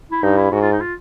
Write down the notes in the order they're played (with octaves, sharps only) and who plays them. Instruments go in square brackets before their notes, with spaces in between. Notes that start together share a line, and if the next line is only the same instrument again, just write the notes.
[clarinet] E4
[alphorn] G2 [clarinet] D#4
[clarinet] E4
[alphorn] G#2 [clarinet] F#4
[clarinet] F4
D#4
F4